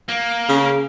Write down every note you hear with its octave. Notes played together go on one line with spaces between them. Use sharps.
A#3
C#3